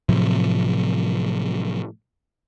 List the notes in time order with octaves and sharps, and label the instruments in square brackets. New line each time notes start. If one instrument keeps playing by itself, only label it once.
[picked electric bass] A2 C3 F3 F#3